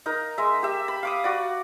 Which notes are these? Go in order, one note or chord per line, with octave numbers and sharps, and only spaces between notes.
D#4 A#4
G#3 E5
G4 E5
B5
F5 D6 D#6
F#4 D5